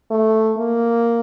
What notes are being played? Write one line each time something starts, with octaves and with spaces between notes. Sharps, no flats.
A3
A#3